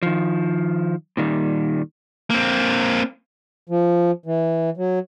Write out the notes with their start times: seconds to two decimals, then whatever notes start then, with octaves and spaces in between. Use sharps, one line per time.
0.03 D#3 F3
1.17 A#2 D#3 G3
2.30 A#3 C4
3.69 F3
4.26 E3
4.77 F#3